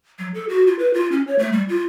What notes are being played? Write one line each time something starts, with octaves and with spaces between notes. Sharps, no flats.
F#3
A4
F#4
F4
B4
F4
C#4
C#5
A3
G3
F4